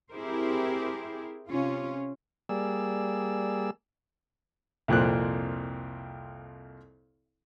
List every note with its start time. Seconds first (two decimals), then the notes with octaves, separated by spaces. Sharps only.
0.11 C4 E4 G4 G#4 A#4 C5
1.48 C3 C#4 F4
2.49 G3 A#3 G#4 D5 E6
4.88 C2 F2 A#2 C4 F#6